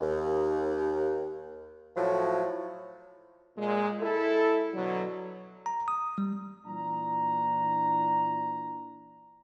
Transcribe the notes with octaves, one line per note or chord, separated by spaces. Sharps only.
D#2
A2 F3 F#3
A#2 G#3
E4 A4
B2 D3 F#3
A#5
D#6
G3
A#2 E3 D4 A#5